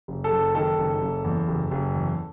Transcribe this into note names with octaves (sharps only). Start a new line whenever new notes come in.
F#1
A4
F#1
D#3 A4
F#1
F#1
E2
F#1
F#1
E2